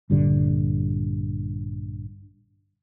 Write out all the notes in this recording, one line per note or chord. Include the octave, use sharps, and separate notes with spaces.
A#1 G2 D3